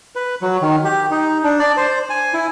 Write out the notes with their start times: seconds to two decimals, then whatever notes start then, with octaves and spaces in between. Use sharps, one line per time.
0.16 B4
0.42 F#3
0.62 D#3
0.85 G4
1.11 D#4
1.44 D4
1.60 D5
1.77 C5
2.10 G#5
2.34 E4